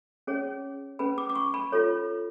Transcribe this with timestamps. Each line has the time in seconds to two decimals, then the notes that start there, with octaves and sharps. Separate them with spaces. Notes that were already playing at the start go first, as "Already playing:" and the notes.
0.27 C#4 G#4 C#5
0.99 C#4 G#4 B4 B5
1.18 D6
1.30 D6
1.35 C#6
1.54 B5
1.72 F4 A4 C#5